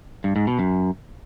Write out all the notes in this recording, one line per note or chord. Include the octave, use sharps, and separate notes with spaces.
G2
G#2
B2
F#2